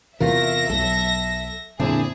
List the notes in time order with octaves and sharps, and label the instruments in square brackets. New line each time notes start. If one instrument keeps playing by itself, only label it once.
[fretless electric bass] E2 C3 E3 [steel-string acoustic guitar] A3 F4 A#4 [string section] E5 A#6
[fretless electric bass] B1 F#3 [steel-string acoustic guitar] A4
[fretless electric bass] F2 A#2 D3 [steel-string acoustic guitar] C4 D4 E4 [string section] G#4